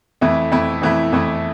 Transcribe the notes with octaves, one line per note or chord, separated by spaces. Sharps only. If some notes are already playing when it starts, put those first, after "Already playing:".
F2 E3 A3 E4
F2 E3 A3 E4
F2 E3 A3 E4
F2 E3 A3 E4